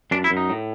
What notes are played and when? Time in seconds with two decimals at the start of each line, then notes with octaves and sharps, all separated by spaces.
0.11 F#2 D4
0.24 E4
0.31 F#2
0.37 D#4
0.50 A2